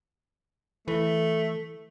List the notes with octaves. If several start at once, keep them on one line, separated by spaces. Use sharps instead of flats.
E3 A3